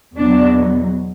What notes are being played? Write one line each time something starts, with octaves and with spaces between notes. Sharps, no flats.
E2 B2 F#3 D4